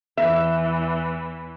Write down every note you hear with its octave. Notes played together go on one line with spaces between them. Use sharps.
E2 E3 E5